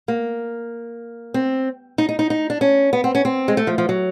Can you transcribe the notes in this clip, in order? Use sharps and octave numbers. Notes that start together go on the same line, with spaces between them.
A#3
C4
D#4
D#4
D#4
D#4
D4
C#4
B3
C4
C#4
C4
G#3
A3
F3
F3
F#3